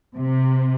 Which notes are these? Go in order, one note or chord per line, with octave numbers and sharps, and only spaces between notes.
C3